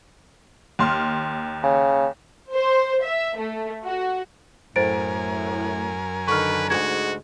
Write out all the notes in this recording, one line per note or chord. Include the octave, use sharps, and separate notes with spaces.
D#2 C6 F6
C#3
C5
E5
A3
F#4
F#2 A2 A#4 C5 G#5 A6 D7
D3 D#3 B4 C#6 F6
D2 G#2 G#3 F#4 G#6